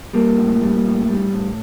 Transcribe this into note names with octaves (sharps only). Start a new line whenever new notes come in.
G3 A#3
A2
G3
A2
G3
A2